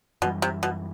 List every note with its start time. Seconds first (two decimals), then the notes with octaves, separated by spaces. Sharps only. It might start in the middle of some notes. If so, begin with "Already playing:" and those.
0.22 F#2 B2 E3 G3
0.42 C3
0.63 B2